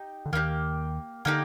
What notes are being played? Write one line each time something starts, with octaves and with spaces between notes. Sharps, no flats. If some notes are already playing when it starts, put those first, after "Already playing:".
Already playing: D#4 G4
D3
D#2 D#3 A#3 D#4 G4
D3 A#3 D#4 G4